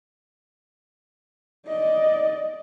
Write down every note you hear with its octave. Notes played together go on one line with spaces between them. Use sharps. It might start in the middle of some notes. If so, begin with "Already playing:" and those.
D5 D#5